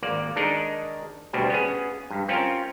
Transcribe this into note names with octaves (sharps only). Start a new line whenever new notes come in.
G#1 A#3 D5
D#3 G#3 D4 D#4 A#4
D2 B2 G3 C4
B3 C#4 G#4
G2
C4 C#4 F4 A#4 C#5